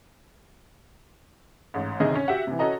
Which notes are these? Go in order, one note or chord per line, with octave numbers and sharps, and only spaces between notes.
A1 G#2
G1 C3 D#3 G#4 D#5
C#4
F#4 G4 E5 F#5
C3 E3
C#4 F#4 A4 D#5 A#5